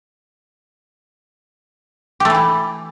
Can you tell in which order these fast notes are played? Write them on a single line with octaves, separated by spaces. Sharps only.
G4 A3 E3 E4